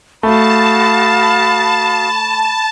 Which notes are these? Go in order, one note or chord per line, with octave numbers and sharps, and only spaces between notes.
A3 F#4 F5 A5 B5 D#6